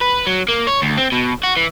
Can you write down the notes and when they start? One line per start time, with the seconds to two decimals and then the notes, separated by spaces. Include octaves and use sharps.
0.01 B4
0.27 F#3
0.49 A#3
0.67 C#5
0.82 D2
0.97 C4
1.12 B2
1.43 F#4
1.57 E3